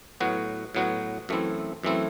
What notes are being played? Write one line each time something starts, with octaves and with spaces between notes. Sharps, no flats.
A2 F#3 B3 F#4
A2 F#3 B3 F#4
F#2 E3 A3 C4 E4
F#2 E3 A3 C4 E4